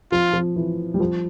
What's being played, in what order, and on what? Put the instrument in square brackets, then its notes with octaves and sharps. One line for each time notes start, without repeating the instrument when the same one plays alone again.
[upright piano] F3 [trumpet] F4
[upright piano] F3
E3
G3
F3